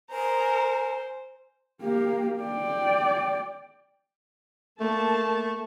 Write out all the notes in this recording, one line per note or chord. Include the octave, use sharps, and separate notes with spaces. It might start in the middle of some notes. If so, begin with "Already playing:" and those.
A#4 C5 G#5
A#3 G4
D5 G5
A3 A#3 A5